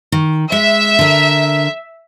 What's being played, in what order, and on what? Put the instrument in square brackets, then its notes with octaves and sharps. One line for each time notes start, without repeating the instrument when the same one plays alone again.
[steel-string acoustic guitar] D#3
[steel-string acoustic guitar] G#3 [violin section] E5
[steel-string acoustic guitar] D3 A#4